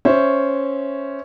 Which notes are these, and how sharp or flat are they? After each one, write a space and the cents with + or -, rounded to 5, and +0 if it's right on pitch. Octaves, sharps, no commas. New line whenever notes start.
C#4 +0 C5 +0 E5 +0